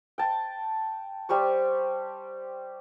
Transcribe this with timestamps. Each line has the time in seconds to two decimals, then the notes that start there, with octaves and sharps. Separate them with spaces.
0.18 G5 A5
1.29 G3 G4 C5 C#6